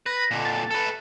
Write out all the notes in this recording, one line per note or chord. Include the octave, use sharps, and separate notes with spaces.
B4 A#6
A#2 D3
A6
A4 B4